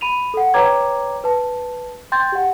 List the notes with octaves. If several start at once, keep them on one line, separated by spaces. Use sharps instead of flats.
B5 D#7 F7
A4 F#5
B4 C#5 G5 A#5 D6 G#6
B4 A5
G5 C6 G6 A6
G4 F#5